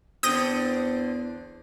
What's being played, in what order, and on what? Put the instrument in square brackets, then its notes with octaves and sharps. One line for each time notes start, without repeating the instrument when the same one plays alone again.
[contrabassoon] E2 [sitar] D3 C4 [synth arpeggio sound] D#6 G6 A#6